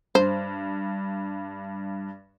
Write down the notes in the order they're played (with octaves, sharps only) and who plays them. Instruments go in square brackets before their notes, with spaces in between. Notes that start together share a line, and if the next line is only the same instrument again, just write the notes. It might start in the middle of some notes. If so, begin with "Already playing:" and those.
[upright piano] G2 [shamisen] C5